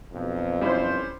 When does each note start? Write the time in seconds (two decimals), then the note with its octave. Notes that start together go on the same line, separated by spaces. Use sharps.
0.13 B1 F2
0.61 G3 C#4 E4 C5